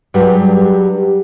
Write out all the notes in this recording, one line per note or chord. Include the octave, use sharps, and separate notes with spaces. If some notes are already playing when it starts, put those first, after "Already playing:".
G2 F#3 G3 G4 G#4